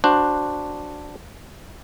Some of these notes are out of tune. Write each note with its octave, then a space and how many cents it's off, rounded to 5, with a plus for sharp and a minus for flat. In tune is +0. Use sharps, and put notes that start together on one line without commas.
D4 +0 F#4 +0 C5 +0